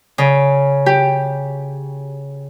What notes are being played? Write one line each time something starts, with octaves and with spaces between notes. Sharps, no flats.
C#3
G4